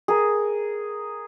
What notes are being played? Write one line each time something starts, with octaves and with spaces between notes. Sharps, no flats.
G#4 A#4